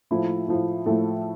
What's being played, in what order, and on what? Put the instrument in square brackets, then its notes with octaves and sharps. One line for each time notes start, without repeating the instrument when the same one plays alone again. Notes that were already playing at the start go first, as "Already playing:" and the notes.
[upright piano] A2 F3 A3 E4
A2 F3 A3
A2 F3 A3 A4